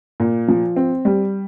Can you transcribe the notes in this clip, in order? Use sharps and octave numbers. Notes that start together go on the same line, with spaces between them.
A#2
F3
C4
G3